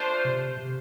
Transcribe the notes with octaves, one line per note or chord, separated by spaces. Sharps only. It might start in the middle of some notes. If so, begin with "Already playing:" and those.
Already playing: A3 D4 F4 C5
C3
C3